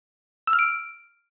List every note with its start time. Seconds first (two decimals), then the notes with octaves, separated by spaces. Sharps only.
0.47 E6
0.53 F6
0.59 D7